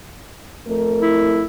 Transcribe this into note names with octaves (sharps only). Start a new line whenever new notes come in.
F2 A3 A#4
E4